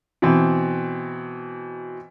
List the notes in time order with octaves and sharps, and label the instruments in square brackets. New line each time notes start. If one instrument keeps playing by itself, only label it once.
[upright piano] B2 E3 C4